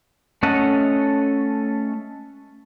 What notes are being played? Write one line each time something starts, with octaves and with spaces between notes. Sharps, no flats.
A3 C#4 A4 D#5 F#5